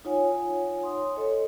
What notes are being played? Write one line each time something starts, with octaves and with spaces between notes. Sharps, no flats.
D#4 F4 C#5 F#5 G#5
C6 D#6
A4 C#5 D#5